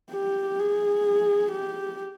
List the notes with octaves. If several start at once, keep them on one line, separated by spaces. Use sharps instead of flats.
G4
G#4
G4